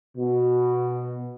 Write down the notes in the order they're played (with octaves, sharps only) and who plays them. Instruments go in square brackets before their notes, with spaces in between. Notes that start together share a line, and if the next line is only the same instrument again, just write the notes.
[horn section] B2